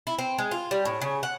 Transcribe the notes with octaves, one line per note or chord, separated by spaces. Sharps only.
E4
C4
G#3
F4
G3
A2
C#3
F#5